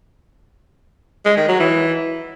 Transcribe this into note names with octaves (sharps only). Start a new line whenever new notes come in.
G#3
D#3
F#3
E3